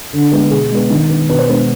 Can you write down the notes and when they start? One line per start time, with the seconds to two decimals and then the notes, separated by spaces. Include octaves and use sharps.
0.13 D3
0.32 G#3 B3
0.51 B2 G#4
0.71 G#3 B3
0.90 D#3
1.09 B3
1.29 B2 B4
1.39 C5
1.49 G#3 B3 B4